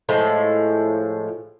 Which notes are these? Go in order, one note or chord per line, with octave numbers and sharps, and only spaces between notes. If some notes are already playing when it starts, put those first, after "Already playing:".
A2 F3 G#3